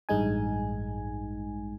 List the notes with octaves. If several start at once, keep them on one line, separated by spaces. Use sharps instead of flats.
A1 G2 G#3 D#4 G#5